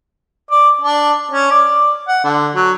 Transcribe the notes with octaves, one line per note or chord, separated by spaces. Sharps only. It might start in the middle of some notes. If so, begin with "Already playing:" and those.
D5
D4
C#4
D5
F#5
D3
F#3